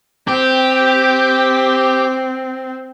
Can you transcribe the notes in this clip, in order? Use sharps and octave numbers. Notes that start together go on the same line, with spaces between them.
C4 G4